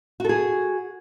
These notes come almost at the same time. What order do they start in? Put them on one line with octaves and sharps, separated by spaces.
F#4 A4 G#4